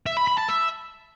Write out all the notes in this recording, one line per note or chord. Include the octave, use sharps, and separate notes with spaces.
E5
B5
B5
A5
E5